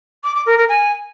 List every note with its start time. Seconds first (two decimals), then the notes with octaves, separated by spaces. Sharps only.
0.23 D6
0.35 D6
0.46 A#4
0.57 A#4
0.68 G#5